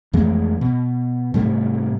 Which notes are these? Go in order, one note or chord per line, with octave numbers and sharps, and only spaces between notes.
F2 E3 G#3 A3
B2
G#2 C3 G3 A3